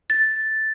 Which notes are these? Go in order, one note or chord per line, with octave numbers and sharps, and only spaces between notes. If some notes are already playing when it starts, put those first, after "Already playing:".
A6